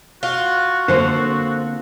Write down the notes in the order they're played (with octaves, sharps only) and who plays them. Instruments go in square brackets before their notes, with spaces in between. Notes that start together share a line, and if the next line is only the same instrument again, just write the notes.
[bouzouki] F4 [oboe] F#4
[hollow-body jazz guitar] D3 A#3 [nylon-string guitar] C4 A4 C5